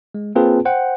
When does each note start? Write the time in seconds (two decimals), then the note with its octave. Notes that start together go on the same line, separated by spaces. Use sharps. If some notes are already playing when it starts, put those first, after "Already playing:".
0.14 G#3
0.35 A#3 C4 F4 G#4 B4 A5
0.65 C5 F#5 G5